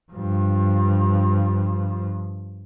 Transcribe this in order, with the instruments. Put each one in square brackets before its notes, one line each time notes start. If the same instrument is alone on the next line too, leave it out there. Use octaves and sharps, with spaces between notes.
[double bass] G2 F3